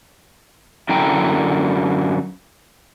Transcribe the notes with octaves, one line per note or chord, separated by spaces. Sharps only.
F#2 D3 E4 G5 A#5